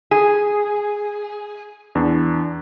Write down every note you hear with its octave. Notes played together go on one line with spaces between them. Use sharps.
G#4
E2 D4